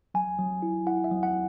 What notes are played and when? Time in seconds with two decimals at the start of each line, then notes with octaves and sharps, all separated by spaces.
0.14 F#3 G#5
0.39 F#3
0.62 E4
0.87 E4 F#5
1.04 E5
1.11 F#3
1.23 F#5